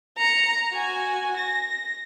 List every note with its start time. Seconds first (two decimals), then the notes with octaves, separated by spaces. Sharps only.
0.18 A#5 C#7
0.73 F#4 G#5
1.37 A#6